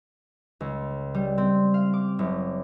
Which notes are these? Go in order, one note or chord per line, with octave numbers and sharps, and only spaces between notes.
C#2
G3
C4
F5
D6
F#1